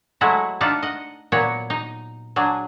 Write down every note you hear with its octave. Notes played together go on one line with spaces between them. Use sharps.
F#3 G#3 A3 E4 F#4
D4 D#4 F4 E5 F#5 A5
D#5 F#5
A#2 F#3 B3 C#5 F#5
D#4
F#3 D4 G#4